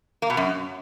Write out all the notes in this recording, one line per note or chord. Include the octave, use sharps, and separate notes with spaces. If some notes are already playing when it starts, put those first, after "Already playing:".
A#3
B2
F#2